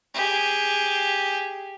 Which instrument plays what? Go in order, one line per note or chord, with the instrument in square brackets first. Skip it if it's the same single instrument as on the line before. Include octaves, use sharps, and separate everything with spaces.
[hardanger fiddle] G4 G#4